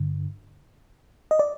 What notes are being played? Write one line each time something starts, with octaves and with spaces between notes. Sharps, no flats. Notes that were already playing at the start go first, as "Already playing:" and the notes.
Already playing: G2 D3
D#5
D5